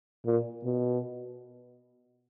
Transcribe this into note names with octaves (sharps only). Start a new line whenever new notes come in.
A#2
B2